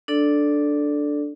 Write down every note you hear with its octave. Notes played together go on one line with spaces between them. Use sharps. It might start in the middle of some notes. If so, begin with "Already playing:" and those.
D4 A4 D5